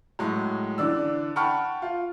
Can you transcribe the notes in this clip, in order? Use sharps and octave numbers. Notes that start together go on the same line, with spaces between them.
A2 F#3 G#3
D3 E3 D5 E6
F#5 G5 A5 B5 C#6 F6
F4